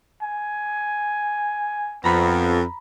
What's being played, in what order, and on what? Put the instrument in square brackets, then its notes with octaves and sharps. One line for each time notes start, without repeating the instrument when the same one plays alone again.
[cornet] G#5
[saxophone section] F2 [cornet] B3 [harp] A#5 B5